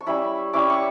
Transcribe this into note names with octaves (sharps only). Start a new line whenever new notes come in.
C#6
G3 C#4 E4 B5
G3 C#4 E4 D6
C#6